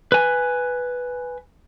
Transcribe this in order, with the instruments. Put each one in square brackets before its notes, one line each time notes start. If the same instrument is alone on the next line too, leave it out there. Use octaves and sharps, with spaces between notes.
[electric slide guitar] B4 G#5